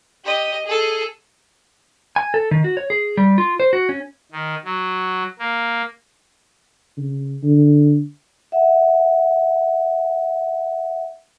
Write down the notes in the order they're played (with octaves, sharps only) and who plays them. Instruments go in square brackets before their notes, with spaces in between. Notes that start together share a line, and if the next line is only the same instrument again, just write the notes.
[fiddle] G4 D#5
G#4 A4
[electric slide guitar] G#5
A4
D#3
F#4
C#5
G#4
G3
F4
C5
F#4
C#4
[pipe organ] D#3
F#3
A#3
[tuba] C#3
D3
[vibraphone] E5 F#5